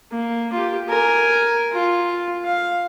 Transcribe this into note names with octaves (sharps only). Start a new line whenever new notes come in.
A#3
F4 G4
A#4 G#5
F4
F5